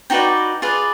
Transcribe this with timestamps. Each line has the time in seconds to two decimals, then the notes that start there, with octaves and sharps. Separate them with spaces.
0.10 D#4 F#4 B4 D5 G5
0.62 F4 G#4 B4 D5